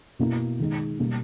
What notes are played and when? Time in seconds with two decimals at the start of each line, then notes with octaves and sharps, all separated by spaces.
0.19 B2 A#3 E4
0.59 D#3 G#3 D#4
0.99 B2 G3 A#3